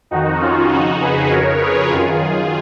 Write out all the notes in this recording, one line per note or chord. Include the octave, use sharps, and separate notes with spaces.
F2 D#3 D#4 F#4
C#4 F4
F2 C#3 D#4 F#4
G#4 B4
F2 C#3 A#4 C#5
G#4 B4
F#2 D#3 F4 G#4